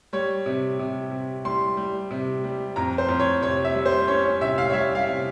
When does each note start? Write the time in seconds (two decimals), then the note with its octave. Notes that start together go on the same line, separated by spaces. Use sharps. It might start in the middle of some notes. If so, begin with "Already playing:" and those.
0.13 G3 C#5
0.46 C3
0.79 C3
1.11 C3
1.45 G3 C6
1.77 G3
2.11 C3
2.44 G3
2.76 F2 A#5
2.98 C5
3.09 F2
3.20 C#5
3.42 C3 C#5
3.65 E5
3.74 G3
3.86 C5
4.07 C#4 C#5
4.24 C#5
4.41 C3 E5
4.58 F5
4.70 C#5
4.73 G3 E5
4.95 F5
5.07 C3